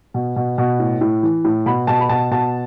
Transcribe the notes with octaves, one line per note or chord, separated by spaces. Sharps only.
B2
B2
B2
A2
A2
E3
A2
B2 B5
B2 A5
B5
B2 A5
B2 A5